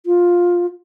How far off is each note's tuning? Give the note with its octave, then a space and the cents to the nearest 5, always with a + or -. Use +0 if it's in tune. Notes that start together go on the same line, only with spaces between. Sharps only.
F4 +10